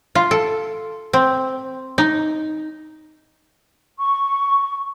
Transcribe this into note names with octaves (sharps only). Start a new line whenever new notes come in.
F4
A4
C4
D#4
C#6